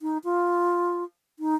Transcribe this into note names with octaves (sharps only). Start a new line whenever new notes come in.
D#4
F4
D#4